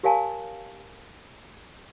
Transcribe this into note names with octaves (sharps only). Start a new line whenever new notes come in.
G4 A#4 C#5 F5 G#5 A5